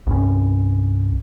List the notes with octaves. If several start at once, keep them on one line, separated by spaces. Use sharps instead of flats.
C2 G2 C#4